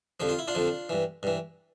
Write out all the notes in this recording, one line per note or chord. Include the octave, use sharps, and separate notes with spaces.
F2 D3 F3 G4
F4
E4
D4 F4
F2 D3 F3
G2 E3
G2 E3